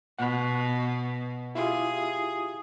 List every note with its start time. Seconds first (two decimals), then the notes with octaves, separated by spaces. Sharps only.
0.19 B2 F#5 B5
1.55 E4 F4 G4 G#4